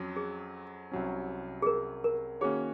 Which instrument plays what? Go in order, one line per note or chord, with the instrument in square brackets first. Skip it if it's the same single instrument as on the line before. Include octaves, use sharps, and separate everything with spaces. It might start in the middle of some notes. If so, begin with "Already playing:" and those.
Already playing: [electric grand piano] F2 F#3 C#4
[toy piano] G#4
[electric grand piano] C2 C3 F#3 C#4
[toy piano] G#4
A#4
A#4
[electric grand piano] D#3 A#3 C#4 F#4 C#5 [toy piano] G#4